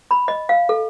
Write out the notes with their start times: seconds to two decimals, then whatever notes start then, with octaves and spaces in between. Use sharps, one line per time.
0.11 B5
0.28 D#5
0.49 F5
0.69 A4